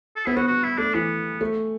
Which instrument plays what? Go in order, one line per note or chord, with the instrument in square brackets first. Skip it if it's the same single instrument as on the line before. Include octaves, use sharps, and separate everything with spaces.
[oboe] A4
[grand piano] B3 [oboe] E4
[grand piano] B3 [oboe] F#4
[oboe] F#4
E4
[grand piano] A3 [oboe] D4
[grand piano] E3 [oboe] B3
[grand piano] A3